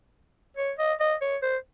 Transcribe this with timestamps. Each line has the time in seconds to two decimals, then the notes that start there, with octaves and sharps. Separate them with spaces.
0.57 C#5
0.78 D#5
1.00 D#5
1.22 C#5
1.42 C5